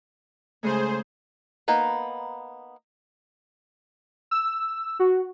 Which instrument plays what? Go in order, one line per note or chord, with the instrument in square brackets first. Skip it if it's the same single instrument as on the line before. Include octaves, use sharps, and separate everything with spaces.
[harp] C#3 G#3 A3 [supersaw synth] G#4 C5
[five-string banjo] A#3 B3 D#4 B4
[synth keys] E6
F#4